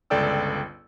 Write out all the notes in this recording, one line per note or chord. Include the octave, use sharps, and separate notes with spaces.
G1 C#2 A4 D5 G5 E6